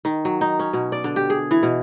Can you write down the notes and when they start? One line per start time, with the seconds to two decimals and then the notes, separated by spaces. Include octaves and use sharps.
0.05 D#3
0.25 F#3
0.41 D#4
0.59 C#4
0.73 B2
0.92 D5
1.04 D3
1.16 G4
1.30 G#4
1.51 E3
1.63 B2